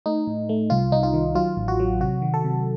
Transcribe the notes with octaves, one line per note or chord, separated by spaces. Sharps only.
A3 D#4
A2
A3
C2 F4
C2 D#4
F4
D#3
F#3 F4
A1
F#4
F#3
C3 F#4
D#3
A4
C3